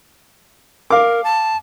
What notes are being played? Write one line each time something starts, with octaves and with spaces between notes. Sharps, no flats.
A#4 F5 D6
A5